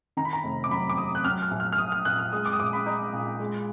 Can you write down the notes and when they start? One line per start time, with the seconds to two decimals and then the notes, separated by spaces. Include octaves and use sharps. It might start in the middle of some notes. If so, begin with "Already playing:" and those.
0.17 D#3 A#5
0.25 B5
0.33 A#5
0.44 F1
0.64 D6
0.71 F#3 B5
0.89 D6
0.98 D#2 D#6
1.15 F#6
1.24 F#3 F6
1.42 F6
1.51 A#1
1.60 F6
1.73 F6
1.78 A#1 D#6
1.92 F6
2.05 A#2 F#6
2.19 F6
2.32 G#3 D#6
2.46 D6
2.53 D#6
2.59 A#1 D6
2.73 B5
2.86 D#4
3.13 A#2
3.40 G#3